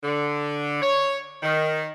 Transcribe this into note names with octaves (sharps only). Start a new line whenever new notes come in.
D3
C#5
D#3